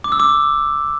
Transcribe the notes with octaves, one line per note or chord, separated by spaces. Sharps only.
D6
E6
D6